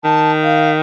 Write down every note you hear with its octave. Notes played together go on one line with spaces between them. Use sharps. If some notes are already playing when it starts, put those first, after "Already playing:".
D#3 A5
F5